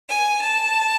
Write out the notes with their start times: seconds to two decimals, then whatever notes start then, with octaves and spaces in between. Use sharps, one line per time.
0.09 G#5
0.42 A5